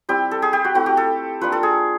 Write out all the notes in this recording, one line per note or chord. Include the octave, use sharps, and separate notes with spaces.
G3 C4 E4 G4
A4
G#4
G4
F#4
A3 C4 E4 F#4
G4
A4
A#3 D4 F4 B4
A4
G#4